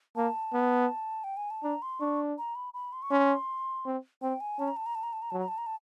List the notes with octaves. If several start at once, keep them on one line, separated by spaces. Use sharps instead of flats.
A#3 A5
B3
G5
G#5
A5
D4 A#5
C6
D4 C#6
A#5
B5
B5
C6
C#6
C#4 C6
C4
C4 G5
G#5
C#4 A5
A#5
A5
A#5
A5
A#5
A5
A#5
F#3 A5
A#5
A5
A#5
A5